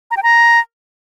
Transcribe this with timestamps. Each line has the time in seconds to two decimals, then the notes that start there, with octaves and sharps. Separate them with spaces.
0.11 A#5
0.17 G5
0.23 A#5